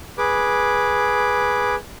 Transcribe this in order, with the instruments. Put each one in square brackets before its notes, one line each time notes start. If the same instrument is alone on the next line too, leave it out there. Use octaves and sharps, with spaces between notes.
[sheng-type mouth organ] G#4 B4 D6